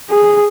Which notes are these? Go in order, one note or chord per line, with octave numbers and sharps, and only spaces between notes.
G#4